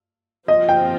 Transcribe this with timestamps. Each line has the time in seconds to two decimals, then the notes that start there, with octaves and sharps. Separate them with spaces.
0.48 F3 C4 F4 D#5
0.69 G5